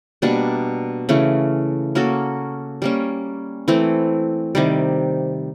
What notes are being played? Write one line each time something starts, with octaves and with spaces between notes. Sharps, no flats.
B2 G3 A#3 D4
C#3 E3 A3 C#4
A#3 C#4 F#4 A4
G3 A#3 C#4
E3 A3 C4
C3 D#3 G3